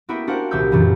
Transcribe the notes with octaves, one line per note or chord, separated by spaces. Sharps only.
A#3 B3 E4 F#4 E5 G5
D4 F#4 A#4 C5 F5 F#5
D#1 C2 E5 D6 E6 G6
F#2 A#2 C#3 E3